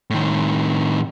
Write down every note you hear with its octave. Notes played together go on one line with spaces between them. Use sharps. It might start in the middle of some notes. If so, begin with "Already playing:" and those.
A2 D#3